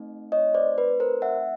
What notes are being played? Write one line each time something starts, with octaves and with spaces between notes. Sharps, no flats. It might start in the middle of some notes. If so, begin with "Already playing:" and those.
Already playing: A3 C4 D#4
C#5 D#5
C5 D5
B4
A#4 C5
E5 F#5